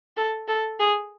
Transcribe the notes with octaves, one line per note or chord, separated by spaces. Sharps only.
A4
A4
G#4